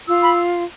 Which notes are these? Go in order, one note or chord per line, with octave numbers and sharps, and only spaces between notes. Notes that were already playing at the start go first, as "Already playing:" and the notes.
F4 E6
B5